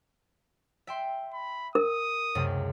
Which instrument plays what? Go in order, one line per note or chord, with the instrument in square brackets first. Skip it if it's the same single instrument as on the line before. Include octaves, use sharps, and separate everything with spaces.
[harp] E5 G5 C6
[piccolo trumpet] B5
[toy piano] A#4 [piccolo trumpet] D#6
[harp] C#2 F#2 C3